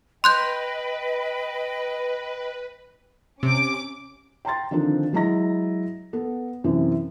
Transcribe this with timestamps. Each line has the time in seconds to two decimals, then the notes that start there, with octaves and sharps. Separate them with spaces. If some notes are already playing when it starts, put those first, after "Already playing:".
0.24 B4 D#5 G5 B5 C6 F#6 G6
3.43 C3 C#4 D6 D7
4.45 G5 A#5 C6 A6
4.71 D3 D#3 F3 C4 D4 D#4
5.13 F#3 G#3 E4 D#5 A#5 A#6
6.13 B3 A4
6.64 F#2 C3 E3 E4